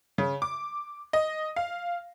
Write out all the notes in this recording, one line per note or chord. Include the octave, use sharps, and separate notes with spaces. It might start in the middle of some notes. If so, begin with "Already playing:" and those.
C#3
D6
D#5
F5